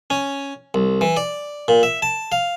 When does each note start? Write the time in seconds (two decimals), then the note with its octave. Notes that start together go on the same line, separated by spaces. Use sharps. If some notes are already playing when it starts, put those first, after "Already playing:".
0.10 C#4
0.74 C2
1.01 E3
1.17 D5
1.68 A#2
1.83 E5
2.02 A5
2.32 F5